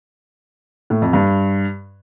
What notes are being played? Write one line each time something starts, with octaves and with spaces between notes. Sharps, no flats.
A2
F2
G2